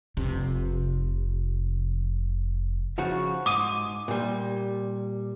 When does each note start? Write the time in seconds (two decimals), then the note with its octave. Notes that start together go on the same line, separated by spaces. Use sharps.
0.17 F1 C3
2.98 C#3 F3 F#4
3.46 G#2 D6 D#6 D#7
4.08 A#2 G3